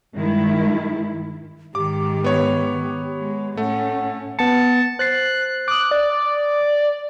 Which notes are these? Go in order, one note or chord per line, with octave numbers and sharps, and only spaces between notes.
G2 D#3 G#3 E4
G#2 D#3 G4 D6
B3 C#5
G#3
A2 A3 C#4 F#5
B3 A5 C#7
C5 F#6 A6 C7
D6 D#6 F#6
D5